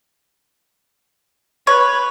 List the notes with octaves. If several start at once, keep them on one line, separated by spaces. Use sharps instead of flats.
B4 C#5